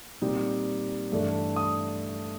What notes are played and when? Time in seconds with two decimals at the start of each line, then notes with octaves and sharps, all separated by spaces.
0.21 A#2 G3 C4 D#4
1.12 G2 E3 A3 D4
1.56 D#6